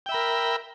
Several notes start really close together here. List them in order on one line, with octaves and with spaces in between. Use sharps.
G5 E5 B5 A#4